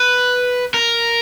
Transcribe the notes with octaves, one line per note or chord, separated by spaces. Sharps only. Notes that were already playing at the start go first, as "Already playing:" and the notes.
Already playing: B4
A#4